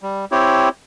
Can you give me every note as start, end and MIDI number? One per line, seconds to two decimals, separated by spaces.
0.03 0.25 55
0.32 0.69 60
0.32 0.69 64
0.32 0.69 67
0.32 0.69 73